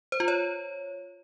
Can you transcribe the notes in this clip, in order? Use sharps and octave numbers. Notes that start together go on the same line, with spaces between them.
C5
F4
C#5